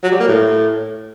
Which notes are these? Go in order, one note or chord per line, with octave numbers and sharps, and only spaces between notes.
F#3
G3
A#3
A2